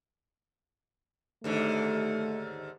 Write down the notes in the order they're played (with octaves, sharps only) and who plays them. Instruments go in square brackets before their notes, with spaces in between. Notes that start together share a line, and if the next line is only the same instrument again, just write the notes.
[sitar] D#2 G#2 D3 [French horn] A3